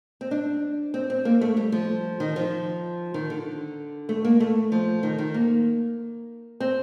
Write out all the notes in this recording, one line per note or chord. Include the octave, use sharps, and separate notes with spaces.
C4
D4
C4
C4
A#3
A3
G3
F3
D#3
F3
D#3
D3
A3
A#3
A3
F3
D#3
D#3
A#3
C4